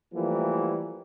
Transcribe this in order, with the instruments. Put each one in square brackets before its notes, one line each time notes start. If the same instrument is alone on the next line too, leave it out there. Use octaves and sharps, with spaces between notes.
[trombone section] E3 F3 G3 A3 A#3